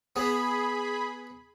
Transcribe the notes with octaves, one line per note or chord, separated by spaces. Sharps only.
B3 G#4 B5